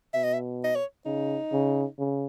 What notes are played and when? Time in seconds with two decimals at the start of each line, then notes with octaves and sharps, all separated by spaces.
0.14 B2 E5
0.24 D#5
0.33 E5
0.64 D#5
0.76 C#5
1.06 C#3 D#4
1.53 C#3
1.99 C#3